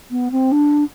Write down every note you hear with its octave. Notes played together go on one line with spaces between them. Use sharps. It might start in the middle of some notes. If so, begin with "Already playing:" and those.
B3
C4
D4